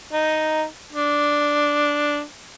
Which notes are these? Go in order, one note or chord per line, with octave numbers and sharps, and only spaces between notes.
D#4
D4